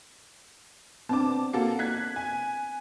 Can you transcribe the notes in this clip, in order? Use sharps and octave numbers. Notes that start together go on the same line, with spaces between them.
B3 C4 D4 A5 D6
A#3 F#4 A4
F#6 G#6 B6
G#5